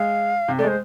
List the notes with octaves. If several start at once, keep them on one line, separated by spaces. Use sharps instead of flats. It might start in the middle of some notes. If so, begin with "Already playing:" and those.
Already playing: G#3 F5
C3
G#3 A3 C5 D5